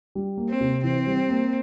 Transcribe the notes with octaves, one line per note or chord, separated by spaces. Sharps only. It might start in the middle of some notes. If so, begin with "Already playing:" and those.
G3
A#3
C4
C3
E3 C4
G3
A#3